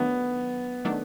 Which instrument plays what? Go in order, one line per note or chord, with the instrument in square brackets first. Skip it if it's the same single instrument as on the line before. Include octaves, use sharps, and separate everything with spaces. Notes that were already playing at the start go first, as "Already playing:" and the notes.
Already playing: [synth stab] D#3 F#3 A3 D4 [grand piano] B3
[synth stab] D#3 F#3 A3 D4